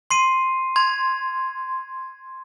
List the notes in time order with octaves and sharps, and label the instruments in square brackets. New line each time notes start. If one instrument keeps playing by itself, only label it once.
[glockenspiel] C6 C7 D#7
[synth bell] C6 [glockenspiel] G#6